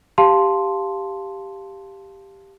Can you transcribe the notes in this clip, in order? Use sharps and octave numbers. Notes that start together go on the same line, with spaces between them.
G4 F5 A5 C6